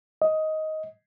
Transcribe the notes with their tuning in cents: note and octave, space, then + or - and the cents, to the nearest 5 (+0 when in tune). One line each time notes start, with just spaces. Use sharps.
D#5 +10